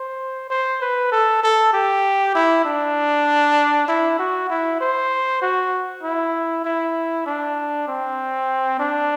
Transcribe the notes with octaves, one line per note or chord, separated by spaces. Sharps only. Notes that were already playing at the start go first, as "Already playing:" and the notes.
Already playing: C5
C5
B4
A4
A4
G4
E4
D4
E4
F#4
E4
C5
F#4
E4
E4
D4
C4
D4